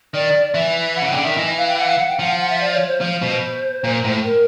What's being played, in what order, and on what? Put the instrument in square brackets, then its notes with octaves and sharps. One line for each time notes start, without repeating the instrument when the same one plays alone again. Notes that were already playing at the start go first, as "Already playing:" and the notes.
[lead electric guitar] D#3 [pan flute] D5
[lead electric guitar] E3 [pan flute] E5
[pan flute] F#5
[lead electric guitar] C#3
[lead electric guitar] D3 [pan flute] G5
[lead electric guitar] D#3 [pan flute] E5
[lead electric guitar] E3 [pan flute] D#5
[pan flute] F5
G5
F#5
F5
F#5
G5
[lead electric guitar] F3 [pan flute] F#5
[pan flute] F5
F#5
E5
D5
C#5
C5
[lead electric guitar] F3
[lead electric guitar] B2 [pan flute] C5
[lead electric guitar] A#2
A2
[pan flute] A#4